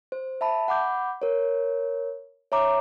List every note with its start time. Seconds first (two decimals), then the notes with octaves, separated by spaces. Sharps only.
0.12 C5
0.41 E5 A5 B5
0.68 F#5 B5 D6 G6
1.22 A#4 C#5
2.52 C#5 E5 A#5 D6